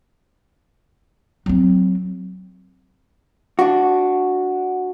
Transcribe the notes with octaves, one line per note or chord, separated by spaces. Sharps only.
F#3 C4
D4 F#4